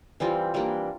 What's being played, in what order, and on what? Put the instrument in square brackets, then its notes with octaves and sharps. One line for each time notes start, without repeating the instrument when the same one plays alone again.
[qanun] E3 G3 C4 F4
E3 G3 A#3 D4